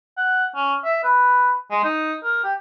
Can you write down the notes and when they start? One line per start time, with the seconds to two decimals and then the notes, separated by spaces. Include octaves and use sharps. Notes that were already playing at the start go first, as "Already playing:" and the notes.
0.17 F#5
0.56 C#4
0.85 E5
1.03 B4
1.71 G#3
1.84 D#4
2.23 A#4
2.44 G4